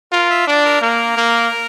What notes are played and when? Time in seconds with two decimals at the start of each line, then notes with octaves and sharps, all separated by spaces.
0.12 F4 A#4
0.30 E5
0.47 D4 D5
0.65 A#4
0.81 A#3 A#4
1.17 A#3